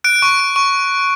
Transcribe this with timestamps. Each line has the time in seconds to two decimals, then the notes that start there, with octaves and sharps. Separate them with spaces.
0.04 F#6 D7
0.22 C#6
0.40 C#6
0.56 C#6